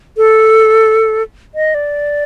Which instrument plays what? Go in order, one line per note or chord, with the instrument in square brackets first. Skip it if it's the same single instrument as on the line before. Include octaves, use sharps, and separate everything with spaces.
[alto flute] A4
D#5
D5